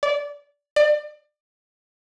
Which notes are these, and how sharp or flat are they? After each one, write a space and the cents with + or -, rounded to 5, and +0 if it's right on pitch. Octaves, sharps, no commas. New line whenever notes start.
D5 -20
D5 +30